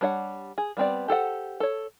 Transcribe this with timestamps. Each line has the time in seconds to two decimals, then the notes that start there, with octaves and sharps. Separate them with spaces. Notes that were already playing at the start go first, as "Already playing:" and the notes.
0.01 G3 D4 C#5 D#5 F#5
0.58 G#4
0.77 G3 B3 C4 D5
1.08 G4 A4 C5 F#5
1.60 A4 C#5